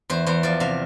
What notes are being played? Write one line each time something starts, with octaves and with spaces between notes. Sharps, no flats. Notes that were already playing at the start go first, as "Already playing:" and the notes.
E2 C5
E2 C5
F3 D5
C3 F5